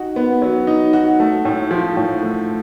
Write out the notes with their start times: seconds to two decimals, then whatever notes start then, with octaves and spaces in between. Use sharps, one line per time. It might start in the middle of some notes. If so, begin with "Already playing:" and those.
Already playing: D#4 F#4
0.16 B3
0.42 F#3
0.67 D#4
0.93 F#4
1.20 A3
1.45 A2
1.71 F3
1.97 A2
2.23 A3